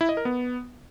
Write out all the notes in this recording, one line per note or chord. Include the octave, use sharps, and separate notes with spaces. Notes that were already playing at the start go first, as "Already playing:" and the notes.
E4
D#5
A#4
B3